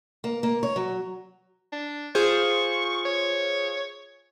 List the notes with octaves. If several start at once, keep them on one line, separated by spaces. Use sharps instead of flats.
A#3
A#3
C#5
F#3
D4
F4 G#4 C5 C#6
C#5